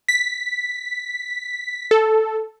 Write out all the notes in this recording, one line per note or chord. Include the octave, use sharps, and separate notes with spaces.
B6
A4